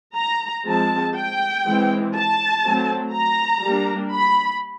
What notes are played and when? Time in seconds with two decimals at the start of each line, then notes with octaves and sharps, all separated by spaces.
0.17 A#5
0.66 F3 G#3 C4 A5
1.16 G5
1.66 E3 G#3 C4
2.15 A5
2.64 F#3 A3 C4
3.14 A#5
3.64 G3 A#3 D4
4.14 B5